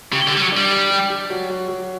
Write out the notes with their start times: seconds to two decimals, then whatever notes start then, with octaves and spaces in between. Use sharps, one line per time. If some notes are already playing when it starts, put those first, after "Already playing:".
0.12 C#3 G4
0.27 D3
0.32 G4
0.37 G3
0.42 F#3
0.52 G3 D4
0.71 G4
0.90 G4
1.10 G4
1.30 F#3
1.50 F#3
1.68 F#3